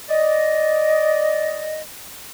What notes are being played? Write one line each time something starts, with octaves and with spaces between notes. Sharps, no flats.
D5 D#5